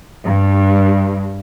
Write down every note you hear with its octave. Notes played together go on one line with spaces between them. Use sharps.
G2